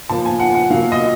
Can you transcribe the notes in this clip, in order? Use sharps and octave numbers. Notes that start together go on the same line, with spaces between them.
A#2 F3 A5
G#5
F#5
F#5
A#2 F#3 F5
D#5